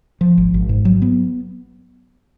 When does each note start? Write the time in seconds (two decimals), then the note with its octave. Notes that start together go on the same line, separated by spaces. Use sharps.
0.21 F3
0.38 G#1
0.54 G#1
0.69 G#2
0.85 F#3
1.02 B3